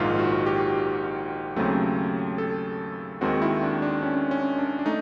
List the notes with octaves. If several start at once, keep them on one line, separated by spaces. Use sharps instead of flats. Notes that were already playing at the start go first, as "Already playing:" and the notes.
Already playing: A#1 G#2 D#3 F4
F#4
G4
D#2 C#3 F#3 A3 C4
A4
D#2 D#3 G#3 C4 F#4
E4
D4
D4
C#4
C#4
D4
D4
A3 D#4